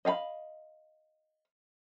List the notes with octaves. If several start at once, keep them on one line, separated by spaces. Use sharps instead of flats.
D#5 F5 G5 B5